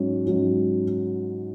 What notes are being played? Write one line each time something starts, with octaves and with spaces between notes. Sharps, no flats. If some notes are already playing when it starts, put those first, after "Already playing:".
Already playing: G#2 F#3 C#4
G#2 F#3 C#4